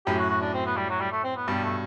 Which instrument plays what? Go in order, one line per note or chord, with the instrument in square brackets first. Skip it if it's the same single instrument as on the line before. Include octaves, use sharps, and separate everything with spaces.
[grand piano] F#2 A2 [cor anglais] G4
[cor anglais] F#4
F#4
D4
C4
B3
G3
F#3
G3
A3
C4
B3
[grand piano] G2 B2 [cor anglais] G3
[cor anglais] A3